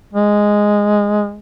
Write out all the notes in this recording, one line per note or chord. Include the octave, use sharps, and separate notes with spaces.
G#3